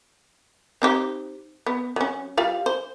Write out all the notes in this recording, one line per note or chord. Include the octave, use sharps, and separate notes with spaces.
C4 D#4 G4
B3
F#3 C#4
G3 F4 F5
C5